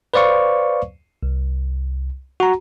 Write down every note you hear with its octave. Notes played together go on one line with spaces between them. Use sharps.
B4 C5 D5 F5 C#6
C2
F#4 A#5